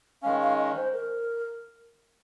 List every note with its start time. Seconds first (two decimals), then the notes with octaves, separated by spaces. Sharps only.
0.23 D#3 G#3 C#4 F5
0.41 F5
0.58 D#5
0.76 C5
0.93 A#4